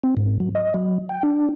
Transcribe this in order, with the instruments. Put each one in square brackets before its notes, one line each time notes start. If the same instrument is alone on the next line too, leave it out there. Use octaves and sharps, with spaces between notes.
[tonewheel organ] C4
G#2
F#3
D#5
F#3
G5
D4